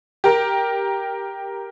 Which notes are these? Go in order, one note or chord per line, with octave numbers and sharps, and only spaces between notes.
G4 A#4